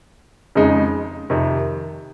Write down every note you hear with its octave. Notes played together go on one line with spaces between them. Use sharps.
F2 C#3 G#3 D#4
F2 C3 D#3